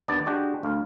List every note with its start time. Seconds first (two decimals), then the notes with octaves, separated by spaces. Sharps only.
0.08 D#2 B3 D4 D5
0.26 G#3 D4 F#4 G4
0.63 D2 F5